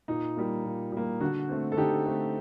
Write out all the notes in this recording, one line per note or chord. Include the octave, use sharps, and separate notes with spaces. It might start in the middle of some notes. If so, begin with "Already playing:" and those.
A#2 D#4
G3 A#3
A#2
G3 A#3
D3 F#4
A3 C4
A4
D3 D#4 G4
A3 C4